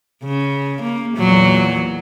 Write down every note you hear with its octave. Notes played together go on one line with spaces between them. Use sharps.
C#3
A#3
E2 A#2 F#3